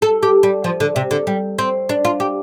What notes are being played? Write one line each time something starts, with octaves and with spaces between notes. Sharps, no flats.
A4
G4
G3
F3
D3
C3
D3
G3
C4
D4
F4
G4